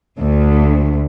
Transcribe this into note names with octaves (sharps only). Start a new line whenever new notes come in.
D2